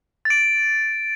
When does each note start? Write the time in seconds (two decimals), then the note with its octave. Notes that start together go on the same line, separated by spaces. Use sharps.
0.25 A6
0.30 D7